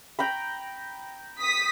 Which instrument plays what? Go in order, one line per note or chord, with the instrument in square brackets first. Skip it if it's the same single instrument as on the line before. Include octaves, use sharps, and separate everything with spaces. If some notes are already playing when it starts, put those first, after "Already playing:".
[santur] G5 A#5 B5
[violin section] D#6 B6